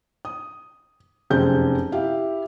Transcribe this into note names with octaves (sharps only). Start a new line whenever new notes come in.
D#6
F1 F#2 G4 G#4 C5 G6
E4 G4 E5 F5